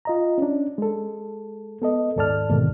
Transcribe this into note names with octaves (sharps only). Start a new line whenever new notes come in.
F4 D#5 A#5
C#4 D4
G#3 A4
B3 A4 D#5
D#2 G#2 A4 D5 A5 F6
D#2 G#2 B2 D3 D#3